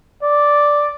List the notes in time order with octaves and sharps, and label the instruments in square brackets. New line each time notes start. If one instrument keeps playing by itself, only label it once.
[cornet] D5